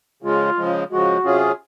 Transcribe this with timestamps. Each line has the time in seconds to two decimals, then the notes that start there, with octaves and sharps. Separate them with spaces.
0.23 C#3 F3 G#3 F4
0.57 C#3 F3 G#3
0.90 C#3 F3 G#3 F#4
1.24 C3 F#3 C#4 F4 G#4